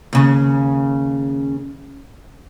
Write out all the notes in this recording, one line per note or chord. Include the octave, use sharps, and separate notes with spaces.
D#2 C#3